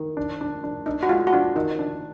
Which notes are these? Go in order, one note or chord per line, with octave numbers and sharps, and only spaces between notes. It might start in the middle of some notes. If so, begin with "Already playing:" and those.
Already playing: D#3
D4
D4
D4
D4 D#4
F#4
G#3 F4
F#4
D4 F4
D#3 D#4
D4